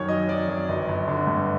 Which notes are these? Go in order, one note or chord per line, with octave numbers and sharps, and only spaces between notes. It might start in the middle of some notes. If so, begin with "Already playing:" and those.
Already playing: F#2 D#3 C#5
F#3 D#5
F#3 D5
F#2
G1 D#5
G1
D3
G2